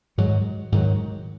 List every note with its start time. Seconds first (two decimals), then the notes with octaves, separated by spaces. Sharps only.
0.18 G#2 D#3 F#3
0.72 G#2 D#3 F#3